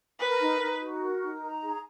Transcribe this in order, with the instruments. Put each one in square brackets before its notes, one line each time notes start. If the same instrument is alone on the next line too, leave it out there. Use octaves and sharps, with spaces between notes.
[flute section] A#4 [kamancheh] B4
[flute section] D#4
D#4
F#4
A#4
D#4
A#5
G#4